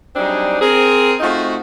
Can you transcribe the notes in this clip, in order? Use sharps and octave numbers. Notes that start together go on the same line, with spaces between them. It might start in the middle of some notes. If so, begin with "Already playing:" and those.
F#3 G3 C4 D4 D#4 G#4
C4 G#4 A#4
A3 C4 D#4 F4 F#4